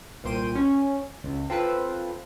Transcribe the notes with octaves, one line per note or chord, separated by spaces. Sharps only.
C2 A#2 C5 G5 D#7
C#4
C#2
C4 F4 A4 B4